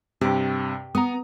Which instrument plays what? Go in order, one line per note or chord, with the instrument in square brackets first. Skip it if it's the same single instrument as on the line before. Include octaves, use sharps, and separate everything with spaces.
[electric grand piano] G2 C3 [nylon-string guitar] G4
[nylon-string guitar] B3 [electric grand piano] A#5 D#6